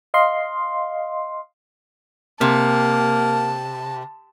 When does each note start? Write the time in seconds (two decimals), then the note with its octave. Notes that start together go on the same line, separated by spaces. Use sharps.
0.14 D#5 F5 C6
2.41 C3 A#3 A5